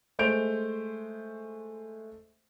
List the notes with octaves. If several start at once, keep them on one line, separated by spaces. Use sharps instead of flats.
G#3 A3 C5 G6 D7 F7